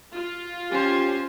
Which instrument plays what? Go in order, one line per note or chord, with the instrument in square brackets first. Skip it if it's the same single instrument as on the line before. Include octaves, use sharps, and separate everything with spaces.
[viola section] F4
[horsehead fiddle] C#4 C5 [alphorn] G4